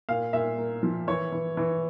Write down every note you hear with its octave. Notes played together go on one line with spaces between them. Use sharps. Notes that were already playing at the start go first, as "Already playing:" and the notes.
A#2 F5
A#2 E5
A#3
F3
E3 C#5
E3
E3